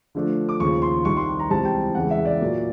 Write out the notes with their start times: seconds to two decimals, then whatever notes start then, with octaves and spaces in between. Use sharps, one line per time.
0.15 D3 F3 A3 D4
0.49 D6
0.60 D#2 C#3 F3 C#6
0.82 C6
1.05 C2 C3 D#3 C#6
1.17 C6
1.39 A#5
1.50 C#2 C3 E3 G3 C4 A5
1.65 G5
1.95 E2 C#3 E3 G#3 F#5
2.11 E5
2.25 D5
2.41 A#2 F#3 A#3